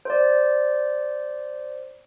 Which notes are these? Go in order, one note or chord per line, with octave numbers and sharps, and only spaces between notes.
C5 D5